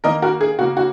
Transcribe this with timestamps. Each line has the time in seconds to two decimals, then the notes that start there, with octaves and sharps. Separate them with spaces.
0.04 D#3 A#3 A#4 D#5
0.22 F#4 A#4
0.41 G#4
0.58 C#3 F#4
0.61 A#3
0.77 F#4